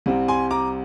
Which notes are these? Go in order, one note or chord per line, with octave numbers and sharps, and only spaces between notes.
C2 C3 G3 C4
G#5 C6
A#5 D6